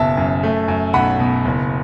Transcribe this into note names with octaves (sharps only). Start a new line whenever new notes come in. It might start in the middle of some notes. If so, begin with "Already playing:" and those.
Already playing: F#1 B2 E5 A5
F#2
A3
F#2
B1 F#5 B5
B2
F#1